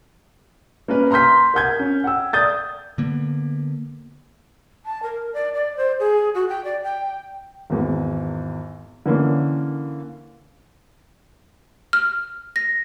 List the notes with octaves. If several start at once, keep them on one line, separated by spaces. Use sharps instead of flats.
A#3 C#4 A#4 B4
A#5 C6 F6 G6 B6
A#4 F#5 G6 G#6
C#4
F#5 G5 E6
D5 D#6 G6 A6
D3 A#3 B3
A5
A#4
D5
D5
C5
G#4
F#4
G5
D5
G5
G#1 E2
D3 E3 A#3 C#4
F6
A#6